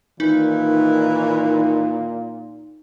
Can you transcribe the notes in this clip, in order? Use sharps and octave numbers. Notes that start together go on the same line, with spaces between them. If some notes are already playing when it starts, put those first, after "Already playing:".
A#2 D#3 E3 D#4